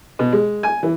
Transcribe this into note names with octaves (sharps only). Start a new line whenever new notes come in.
B2
G#3
G#5
E3